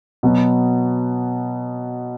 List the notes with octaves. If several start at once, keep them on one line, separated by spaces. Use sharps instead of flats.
B2 F#3 B3